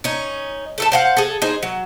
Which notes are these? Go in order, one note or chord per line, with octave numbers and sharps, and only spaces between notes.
C#4 D#4
A3 A4 A5
C5 F5 F#5
G#4 A4
D#4 G#4 C5
F#3